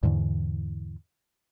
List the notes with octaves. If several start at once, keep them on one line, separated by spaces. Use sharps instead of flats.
E2 G#2 D3 E3